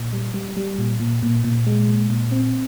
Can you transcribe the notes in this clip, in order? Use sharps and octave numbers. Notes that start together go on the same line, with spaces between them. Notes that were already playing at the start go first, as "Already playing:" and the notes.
Already playing: A#2
G3
G3
G3
A#2
A#2
A#2
A#2
G#3
A#2
A#2
C4